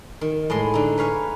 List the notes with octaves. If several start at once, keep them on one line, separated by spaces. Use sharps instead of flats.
D#3
A2 G#3 D#5 C6
D3 D#4
B4 C#5 F5 G#5